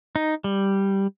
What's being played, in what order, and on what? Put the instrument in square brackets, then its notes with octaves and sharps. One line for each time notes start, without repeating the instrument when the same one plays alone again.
[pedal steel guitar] D#4
G3